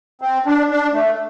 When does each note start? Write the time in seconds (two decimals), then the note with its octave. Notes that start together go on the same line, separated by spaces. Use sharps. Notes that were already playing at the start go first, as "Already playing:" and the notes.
0.21 C4
0.46 D4
0.71 D4
0.94 A3